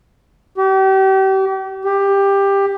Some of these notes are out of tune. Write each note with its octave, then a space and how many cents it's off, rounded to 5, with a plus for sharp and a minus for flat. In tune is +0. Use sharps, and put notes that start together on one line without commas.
G4 -35
G4 +15